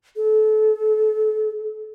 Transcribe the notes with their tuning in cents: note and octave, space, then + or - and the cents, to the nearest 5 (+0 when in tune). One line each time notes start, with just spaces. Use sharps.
A4 -30